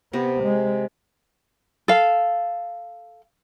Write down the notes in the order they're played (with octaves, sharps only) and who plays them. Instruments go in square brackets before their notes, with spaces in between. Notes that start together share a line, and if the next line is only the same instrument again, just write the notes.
[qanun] C3 A#5 [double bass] B3
[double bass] G#3
[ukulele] A4 F5